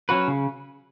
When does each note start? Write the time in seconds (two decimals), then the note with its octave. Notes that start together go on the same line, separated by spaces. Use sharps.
0.09 F#3 C#4 F#4 B4
0.28 C#3